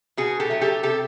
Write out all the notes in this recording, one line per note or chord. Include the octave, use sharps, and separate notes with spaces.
B2 F#4 G#4
G4 A4
F#3 A3
G4 A4
C3 G4 A4